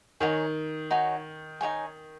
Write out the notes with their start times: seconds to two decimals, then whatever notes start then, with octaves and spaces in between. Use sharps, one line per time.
0.20 D#3 D#4 F#4 C#5 G#5
0.91 D#4 F#4 C#5 G#5
1.61 D#4 F#4 C#5 G#5